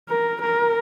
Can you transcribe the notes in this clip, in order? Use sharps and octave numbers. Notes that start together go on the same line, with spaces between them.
A#4
A#4